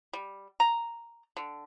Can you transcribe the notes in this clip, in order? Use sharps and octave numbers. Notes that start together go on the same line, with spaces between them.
G3
A#5
D3